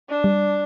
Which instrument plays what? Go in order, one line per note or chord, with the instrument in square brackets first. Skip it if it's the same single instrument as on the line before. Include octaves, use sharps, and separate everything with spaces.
[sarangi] D4
[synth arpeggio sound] G3